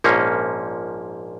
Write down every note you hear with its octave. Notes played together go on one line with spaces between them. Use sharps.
A#1 G#2 F3 A#3 C#4